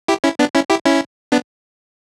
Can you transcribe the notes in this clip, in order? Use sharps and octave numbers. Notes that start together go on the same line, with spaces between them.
E4 G4
C#4 E4
B3 D4
C#4 E4
E4 G4
C#4 E4
B3 D4